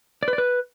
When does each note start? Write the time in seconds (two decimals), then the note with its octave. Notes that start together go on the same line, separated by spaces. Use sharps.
0.23 D5
0.28 B4
0.33 D5
0.38 B4